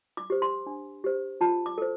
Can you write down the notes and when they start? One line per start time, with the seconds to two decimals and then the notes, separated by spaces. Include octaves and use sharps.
0.17 D6
0.30 G4 C5
0.42 C6
0.66 D4
1.04 G4 C5
1.41 F4 A5
1.66 D6
1.78 A4 C5